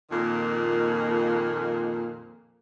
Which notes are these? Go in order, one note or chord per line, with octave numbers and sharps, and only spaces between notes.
F2 A#2 D#3 A#3